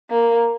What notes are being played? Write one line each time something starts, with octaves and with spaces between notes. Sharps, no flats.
A#3